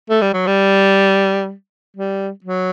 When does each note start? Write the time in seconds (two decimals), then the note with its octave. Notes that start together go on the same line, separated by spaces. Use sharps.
0.10 A3
0.22 G3
0.34 F#3
0.47 G3
1.97 G3
2.44 F#3